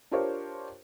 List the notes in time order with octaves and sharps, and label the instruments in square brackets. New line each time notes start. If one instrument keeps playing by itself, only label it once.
[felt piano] D4 F4 G4 A#4 C5 C#5